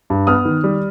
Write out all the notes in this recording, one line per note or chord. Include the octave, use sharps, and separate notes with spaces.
G2
B3 D#6 F6
D#3
G3